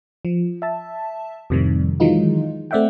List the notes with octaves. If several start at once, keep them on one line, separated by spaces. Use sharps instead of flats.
F3
E5 A5
F2 A2 C3 D#3 G3
D#3 E3 F#3 G#3 D#4 F4
A3 C4 D5 E5 F#5 G5